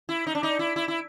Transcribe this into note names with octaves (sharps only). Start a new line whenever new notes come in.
E4
D#4
D4
D#4
E4
E4
E4